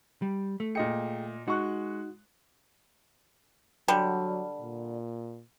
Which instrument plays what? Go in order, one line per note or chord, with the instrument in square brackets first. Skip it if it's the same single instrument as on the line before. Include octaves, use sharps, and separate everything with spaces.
[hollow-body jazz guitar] G3
A3
[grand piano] A#2 D#5 C#7 [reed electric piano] G#4 G5
[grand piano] G#3 C#6 F#6 [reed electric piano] D#4 [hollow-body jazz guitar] F#4
[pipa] D3 G3 [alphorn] F#3
[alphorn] A#2